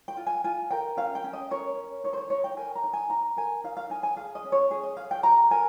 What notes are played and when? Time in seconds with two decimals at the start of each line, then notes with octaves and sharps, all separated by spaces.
0.08 G5
0.17 F4
0.27 G#5
0.44 F4 G#5
0.71 A#4 G5
0.97 C#4 F5
1.15 G5
1.24 C#4
1.33 D#5
1.50 A#4 C#5
1.77 C#4
2.04 D#4 C#5
2.13 C5
2.17 C#5
2.30 D#4 C#5
2.44 G5
2.57 A#4 G#5
2.75 A#5
2.84 D#4
2.93 G#5
3.10 D#4 A#5
3.37 A#4 G#5
3.64 D#4 F5
3.77 F5
3.90 D#4 G#5
4.03 G#5
4.17 G#4 F5
4.35 D#5
4.44 C#4
4.52 C#5
4.71 G#4
4.83 D#5
4.97 G#4 F5
5.11 G5
5.23 G4 A#5
5.51 A#4 G#5